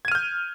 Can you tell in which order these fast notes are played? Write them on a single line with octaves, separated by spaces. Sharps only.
G#6 D#7 F6 G6